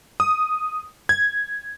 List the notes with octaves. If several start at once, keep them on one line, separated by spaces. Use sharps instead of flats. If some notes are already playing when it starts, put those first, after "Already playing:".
D#6
G#6